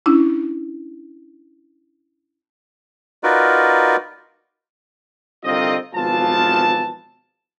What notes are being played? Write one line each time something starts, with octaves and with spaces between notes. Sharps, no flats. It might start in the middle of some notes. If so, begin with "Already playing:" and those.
C#4 D4 E4
D#4 F4 F#4 A#4 B4 D5
C2 D3 D#3 C4 F4 D#5
G#1 B2 E3 F3 F4 A5